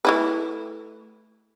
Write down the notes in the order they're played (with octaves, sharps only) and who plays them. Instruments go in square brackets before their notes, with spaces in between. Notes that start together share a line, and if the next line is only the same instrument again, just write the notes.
[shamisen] A3 E4 B4